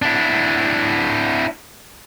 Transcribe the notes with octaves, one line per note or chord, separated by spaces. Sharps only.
D4 E4